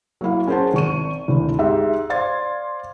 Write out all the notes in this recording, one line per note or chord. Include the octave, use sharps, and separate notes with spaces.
F#3 A#3 E4 F5
C#4 G#4 A#4 C5 F#5 A5
G#1 C#6 D#7
G#1 D2 E4
G#2 G4 E5
C5 D5 F5 C6 G#6 A6